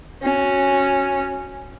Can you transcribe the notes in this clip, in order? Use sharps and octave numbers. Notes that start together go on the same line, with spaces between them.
C#4 F#4